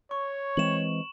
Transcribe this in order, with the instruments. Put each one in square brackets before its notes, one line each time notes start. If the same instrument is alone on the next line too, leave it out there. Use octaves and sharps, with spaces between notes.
[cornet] C#5 [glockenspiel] C#6
[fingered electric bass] E3 G#3 C4 [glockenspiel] E7 F#7